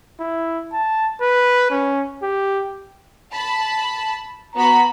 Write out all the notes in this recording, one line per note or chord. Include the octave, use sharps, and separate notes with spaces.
E4
A5
B4
C#4
G4
A5 B5
B3 F#4 A#5 B5